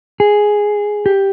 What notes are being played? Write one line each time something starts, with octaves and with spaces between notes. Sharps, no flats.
G#4
G4